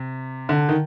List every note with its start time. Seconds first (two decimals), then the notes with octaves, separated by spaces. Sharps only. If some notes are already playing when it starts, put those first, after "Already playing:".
Already playing: C3
0.49 D3
0.69 D#3